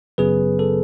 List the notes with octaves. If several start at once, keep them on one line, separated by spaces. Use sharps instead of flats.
G#1 F#2 C#3 F#3 B3 G#4 B4
A4